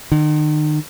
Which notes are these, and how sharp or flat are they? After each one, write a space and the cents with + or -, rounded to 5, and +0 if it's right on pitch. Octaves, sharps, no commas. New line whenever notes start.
D#3 -40